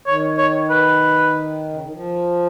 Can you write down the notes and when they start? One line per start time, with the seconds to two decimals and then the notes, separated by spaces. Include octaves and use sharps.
0.07 D#3 C#5
0.38 C#5
0.70 B4
1.71 C#3
1.81 D#3
1.93 F3